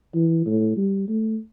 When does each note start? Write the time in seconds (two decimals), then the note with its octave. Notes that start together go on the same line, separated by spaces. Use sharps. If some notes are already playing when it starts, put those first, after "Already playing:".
0.15 E3
0.46 A2
0.77 G3
1.08 A3